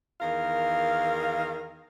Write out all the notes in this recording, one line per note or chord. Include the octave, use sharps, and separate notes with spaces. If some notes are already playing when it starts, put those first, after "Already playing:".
E2 D#3 A#4 F5